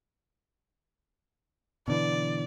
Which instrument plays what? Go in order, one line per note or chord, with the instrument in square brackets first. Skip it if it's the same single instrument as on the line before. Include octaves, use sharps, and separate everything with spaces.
[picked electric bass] B2 D3 E3 [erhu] D5